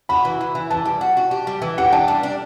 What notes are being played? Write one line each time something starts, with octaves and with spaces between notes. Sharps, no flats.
F#4 B5
E3
E3
E3
E3 A5
G3
F#4
F#4
G4
G3
E3
G4 F#5
G5
D4 A5
G3
D4